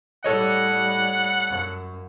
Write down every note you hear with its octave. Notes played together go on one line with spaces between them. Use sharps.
A2 G3 A4 C#5 D#5 F#5
F#2